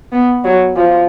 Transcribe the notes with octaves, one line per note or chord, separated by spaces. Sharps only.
B3
F#3
F3